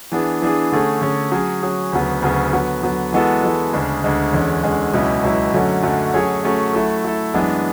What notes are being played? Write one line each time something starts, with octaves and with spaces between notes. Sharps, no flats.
E3 B3 D4 G#4
E3 B3 D4 G#4
D3 A3 C#4 G#4
D3 A3 C#4 G#4
F#3 C#4 G#4
F#3 C#4 G#4
D2 C#3 F#3 B3
D2 C#3 F#3 B3
D3 F#3 B3
D3 F#3 B3
E3 G#3 B3 F#4 A4
E3 G#3 B3 F#4 A4
D2 C#3 G#3 D4
D2 C#3 G#3 D4
E2 D3 G#3 C#4
E2 D3 G#3 C#4
C#2 B2 F#3 C#4 E4
C#2 B2 F#3 C#4 E4
F#2 D3 F#3 A3 C#4
F#2 D3 F#3 A3 C#4
F#3 A3 C#4 G#4 C#5
F#3 A3 C#4 G#4 C#5
F#3 A3 E4 A4
F#3 A3 E4 A4
F#2 E3 G#3 B3 D4